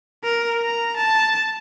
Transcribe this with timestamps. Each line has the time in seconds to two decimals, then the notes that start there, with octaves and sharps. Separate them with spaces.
0.24 A#4
0.61 A#5
0.97 A5